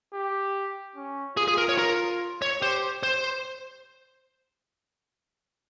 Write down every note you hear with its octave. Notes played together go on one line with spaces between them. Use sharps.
G4
C#4
F4 G#4
G#4
A#4
C#5
A#4
C#5
G4 C5
C5